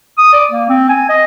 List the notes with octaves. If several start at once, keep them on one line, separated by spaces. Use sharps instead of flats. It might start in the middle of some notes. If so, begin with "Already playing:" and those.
D#6
D5
A#3
C4
G#5
D#5